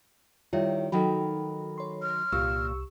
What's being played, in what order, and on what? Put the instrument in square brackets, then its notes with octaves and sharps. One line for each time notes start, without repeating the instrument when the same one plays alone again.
[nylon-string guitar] D#3 G3 [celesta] E4 C#5 E5 [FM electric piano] F4
[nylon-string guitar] D#3 F#3 G5 [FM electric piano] D#4 F#4 [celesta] A4 B5
[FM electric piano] C#5 C6
[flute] F6
[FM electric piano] C2 C#6 E6 [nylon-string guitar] A#2 F4 [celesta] G4